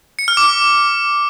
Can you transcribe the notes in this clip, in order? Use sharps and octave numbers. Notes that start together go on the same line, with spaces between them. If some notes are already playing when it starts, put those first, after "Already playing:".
C#7
F6
D6